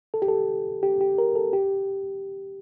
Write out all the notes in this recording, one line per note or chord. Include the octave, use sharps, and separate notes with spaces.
A4
G4
A4
G4
G4
A#4
A4
G4